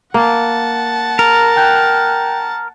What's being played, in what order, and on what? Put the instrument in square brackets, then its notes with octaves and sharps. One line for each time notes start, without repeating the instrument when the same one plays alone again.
[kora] A#3 [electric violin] F#5 A5
[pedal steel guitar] A#4
[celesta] G5 F#6 G6